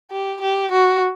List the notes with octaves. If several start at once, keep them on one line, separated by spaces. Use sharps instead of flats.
G4
G4
F#4